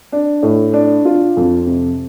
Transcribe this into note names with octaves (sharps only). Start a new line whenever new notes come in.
D4
A2
D4
F4
F2
C3